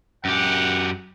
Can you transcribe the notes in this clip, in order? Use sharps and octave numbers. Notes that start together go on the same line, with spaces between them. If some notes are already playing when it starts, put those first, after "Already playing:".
F#2 G4 F#5